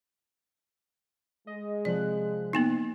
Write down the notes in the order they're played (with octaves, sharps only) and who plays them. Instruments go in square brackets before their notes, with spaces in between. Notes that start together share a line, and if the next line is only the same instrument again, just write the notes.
[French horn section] G#3 [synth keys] D#5
[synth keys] C3 F3 F#6 [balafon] D5
[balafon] A#3 B3 D#4